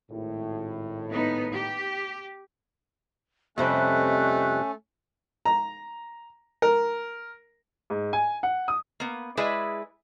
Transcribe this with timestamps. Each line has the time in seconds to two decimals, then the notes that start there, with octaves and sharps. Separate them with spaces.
0.11 G#1 A2
1.11 B3 D#4
1.53 G4
3.58 F2 C3 G3 A3 C#4 D#5 E5 F#6
5.45 A#5
6.62 A#4
7.90 G#2
8.13 G#5
8.43 F#5
8.68 D#6
9.00 A#3 B3
9.37 G#3 E4 G#4 B4 D5 E5